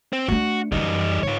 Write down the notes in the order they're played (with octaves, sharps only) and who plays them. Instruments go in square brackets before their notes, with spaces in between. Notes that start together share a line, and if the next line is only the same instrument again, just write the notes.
[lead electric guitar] C4
[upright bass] A3 D4 [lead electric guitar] F#4
[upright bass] F#2 E3 [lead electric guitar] G3 D#4
[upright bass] G#2 [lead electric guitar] F4 C#5